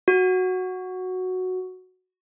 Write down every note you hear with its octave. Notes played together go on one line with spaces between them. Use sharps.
F#4